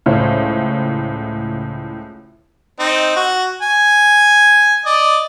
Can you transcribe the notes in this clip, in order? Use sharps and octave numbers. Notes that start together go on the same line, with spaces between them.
C#2 A2 C5 C#5 F6
C4 D#4
F#4
G#5
D5 D#5